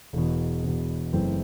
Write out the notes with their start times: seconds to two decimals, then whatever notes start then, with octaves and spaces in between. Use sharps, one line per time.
0.13 E1 E2 B2
0.63 E1 E2 B2
1.13 F#1 F#2 E3 A3 C4